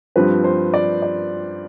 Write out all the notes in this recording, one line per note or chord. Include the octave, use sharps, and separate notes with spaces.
G2 F3 C4 B4
C5
D5
D5